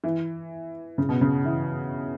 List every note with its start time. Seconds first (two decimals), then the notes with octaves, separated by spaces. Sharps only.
0.04 E3
0.98 C#3
1.09 B2
1.21 C#3
1.45 E3